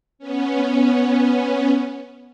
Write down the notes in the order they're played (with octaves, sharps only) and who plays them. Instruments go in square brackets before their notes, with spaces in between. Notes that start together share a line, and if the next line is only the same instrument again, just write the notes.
[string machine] B3 C#4